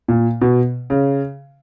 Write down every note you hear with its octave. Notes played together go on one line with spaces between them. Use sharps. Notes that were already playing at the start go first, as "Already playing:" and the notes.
A#2
B2
C#3